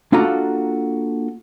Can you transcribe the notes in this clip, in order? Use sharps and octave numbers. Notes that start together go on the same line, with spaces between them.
A#3 D4 F4 F#4 A4 A#5